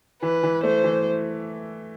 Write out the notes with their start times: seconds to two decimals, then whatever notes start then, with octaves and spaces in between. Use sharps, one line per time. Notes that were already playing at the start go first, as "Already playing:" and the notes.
0.22 E3 B4
0.43 E3
0.63 A3 C5
0.84 E3